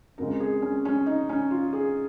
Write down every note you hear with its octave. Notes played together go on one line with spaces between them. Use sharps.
F2 C#3 G#3 A#4
G#4
C#4
C#4
D#4
C#4
F4
G#4